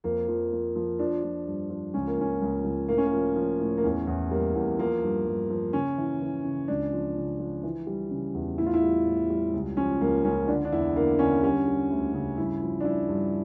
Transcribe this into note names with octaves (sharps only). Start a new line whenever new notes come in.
F2 A#3
F3
F3
F3
F3 D4
F3
G2
F3
C#2 C#4
A#3
C#2 C#4
C#2
C#2
A2 A#3
C#4
A#3
F3
F3
A2
A#3
E2 C#4
E2
G3 A#3
E2
F3 A#3
G2
G2
F3
C#3 C#4
E3
E3
C#3
C#2 D4
F3
C#3
F3
E3
G3
C#3
E2
A2 E4
F4
E4
G3
A2
G3
C#2
F3 C#4
C#2 A#3
C#2 C#4
D3 D4
D4
E2 E4
D3 A#3
D3 C#4
G3 C#4
G3
D2
C#3
G2 E4
F3
D4
G2 E4
G2